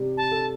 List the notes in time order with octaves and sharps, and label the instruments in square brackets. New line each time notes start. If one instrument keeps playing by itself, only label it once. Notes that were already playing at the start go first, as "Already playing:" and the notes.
Already playing: [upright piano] C3 G3
[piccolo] A5
[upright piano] A4